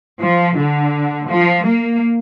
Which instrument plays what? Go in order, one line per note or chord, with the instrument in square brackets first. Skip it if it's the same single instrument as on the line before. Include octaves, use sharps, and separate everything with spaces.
[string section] F3
D3
F3
A#3